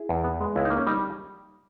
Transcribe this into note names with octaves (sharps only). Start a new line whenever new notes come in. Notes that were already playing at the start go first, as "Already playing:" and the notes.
Already playing: E4 G#4
E2
B3
G#3
C#2 E4
D#4
A#3
C#4
G3 D#4